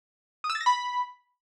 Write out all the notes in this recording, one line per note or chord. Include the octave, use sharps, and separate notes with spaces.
D#6
E6
A6
A#6
B5